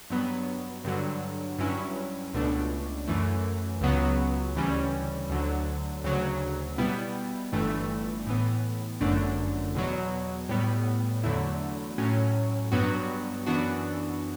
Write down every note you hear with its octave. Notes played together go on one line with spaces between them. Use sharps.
G2 F#3 B3
G2 D3 F#3
G2 F#3 C#4 E4
C#2 B2 A3 D4
F#2 E3 A3
C#2 C#3 F#3 B3
D2 C#3 E3 G3 C#4
D2 D3 F#3
D2 C#3 F#3
B2 G3 B3 E4
G1 G2 E3 A3
A2 E3 B3
G1 F#2 D3 A3 D4
E2 B2 F#3
A2 G3 B3
E2 D3 F#3 A3 E4
A2 F#3 C#4
G2 F#3 B3 F#4
F#2 E3 B3 D4 F#4